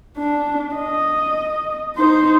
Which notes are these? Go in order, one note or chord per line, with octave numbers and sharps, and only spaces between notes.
D4
D#5
D#4 C5